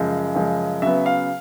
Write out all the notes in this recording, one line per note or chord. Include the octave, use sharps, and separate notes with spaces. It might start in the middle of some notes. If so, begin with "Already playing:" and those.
Already playing: F#2 C#3 F3 G#3
F#2 C#3 F3 G#3
C#3 F#3 B3 E5
F5